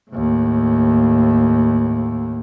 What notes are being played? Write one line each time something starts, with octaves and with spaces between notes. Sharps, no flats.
D#2 A2